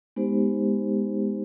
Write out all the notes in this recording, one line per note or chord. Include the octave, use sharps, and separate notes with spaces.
G#3 B3 D#4 G4 C5